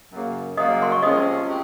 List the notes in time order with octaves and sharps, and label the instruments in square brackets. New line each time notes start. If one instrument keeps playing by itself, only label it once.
[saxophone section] F#2 C#3 F#3 A#3
[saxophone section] F#2 C#3 F#3 A#3 [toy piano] D#5 D#6
[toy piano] C6
C#6
[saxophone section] C3 F3 G#3 C#4 [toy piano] D#5 D#6
[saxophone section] C3